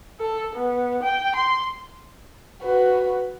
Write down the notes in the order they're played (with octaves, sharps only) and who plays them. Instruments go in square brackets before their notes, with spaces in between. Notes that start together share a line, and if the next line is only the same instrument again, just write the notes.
[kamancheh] A4
B3
G5
C6
F#4 B4